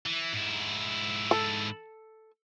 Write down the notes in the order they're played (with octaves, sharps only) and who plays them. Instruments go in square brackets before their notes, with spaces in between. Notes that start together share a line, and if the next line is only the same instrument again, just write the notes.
[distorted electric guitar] E3
G#2 E4
[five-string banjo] A4